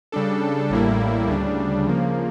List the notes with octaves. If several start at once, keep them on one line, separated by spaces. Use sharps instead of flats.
C#3 G3 D4 A4
A1 A2 G3 A#3 E4
D2 C#3 G3 D4
C#3 F3 A#3